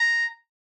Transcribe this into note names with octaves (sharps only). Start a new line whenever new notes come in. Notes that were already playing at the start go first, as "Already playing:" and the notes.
Already playing: A#5